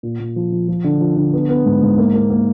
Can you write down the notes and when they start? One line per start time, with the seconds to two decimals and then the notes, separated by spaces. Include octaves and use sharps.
0.03 A#2
0.20 A#2
0.36 F3
0.52 F3
0.68 F3
0.84 D3
1.01 F3
1.17 D3
1.33 B3
1.49 B3
1.65 G#2
1.82 G#2
1.98 A#3
2.14 A#3
2.30 A#3